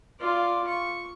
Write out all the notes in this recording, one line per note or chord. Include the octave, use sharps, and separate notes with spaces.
F4 D5
C#6